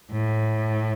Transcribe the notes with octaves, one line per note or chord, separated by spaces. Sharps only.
A2